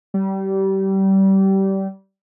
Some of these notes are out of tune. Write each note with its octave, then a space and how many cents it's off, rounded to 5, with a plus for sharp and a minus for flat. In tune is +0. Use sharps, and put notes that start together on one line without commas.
G3 -25